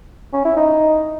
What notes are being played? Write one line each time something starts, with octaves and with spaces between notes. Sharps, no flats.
C#4
E4
D#4